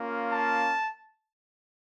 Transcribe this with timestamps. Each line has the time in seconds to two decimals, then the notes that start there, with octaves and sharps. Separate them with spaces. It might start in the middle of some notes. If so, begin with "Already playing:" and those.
Already playing: A#3 C#4 F4
0.31 A5